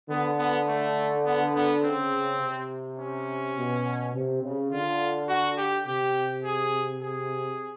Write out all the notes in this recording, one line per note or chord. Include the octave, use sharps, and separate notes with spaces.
D3 B3
B3
A3
B3
B3
C#3 C4
C3
C#4
B2
C3
C#3
D3 F4
F#4
G4
C3 G4
G#4
G#4